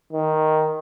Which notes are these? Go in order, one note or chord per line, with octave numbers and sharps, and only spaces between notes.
D#3